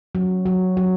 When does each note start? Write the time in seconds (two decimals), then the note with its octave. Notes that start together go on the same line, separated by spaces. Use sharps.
0.15 F#3
0.46 F#3
0.77 F#3